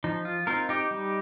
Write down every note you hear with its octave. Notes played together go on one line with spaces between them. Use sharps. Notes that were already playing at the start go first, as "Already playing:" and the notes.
F3 D#4
F4
C4 D#4 F4 A#4
D#4 G4
G3